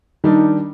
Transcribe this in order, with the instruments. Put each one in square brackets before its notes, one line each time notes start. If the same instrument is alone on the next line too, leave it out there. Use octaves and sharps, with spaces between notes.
[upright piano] D#3 G3 D4 [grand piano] D#4